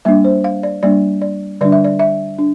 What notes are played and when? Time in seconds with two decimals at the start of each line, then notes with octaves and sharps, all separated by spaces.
0.05 G3 A#3 D4 E5
0.24 C5
0.44 F5
0.63 D5
0.83 G3 A#3 D4 D5
1.22 D5
1.61 D3 G3 D4 D5
1.72 E5
1.84 D5
1.99 E5
2.39 D4